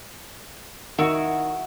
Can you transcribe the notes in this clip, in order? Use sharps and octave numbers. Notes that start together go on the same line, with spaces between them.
D#3 E4 F#4